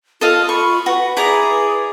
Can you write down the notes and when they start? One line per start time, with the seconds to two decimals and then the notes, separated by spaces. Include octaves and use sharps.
0.21 F4 A4 D#5 F5
0.49 B5 C#6
0.86 F#4 B4
1.17 E4 G#4 D5 A#5